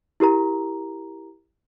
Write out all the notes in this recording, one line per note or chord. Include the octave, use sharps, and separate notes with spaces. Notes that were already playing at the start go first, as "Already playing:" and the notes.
E4 G4 A#4 A#5